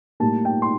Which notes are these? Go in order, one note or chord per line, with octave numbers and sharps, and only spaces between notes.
A2 G3 A#3 A5
G5
C6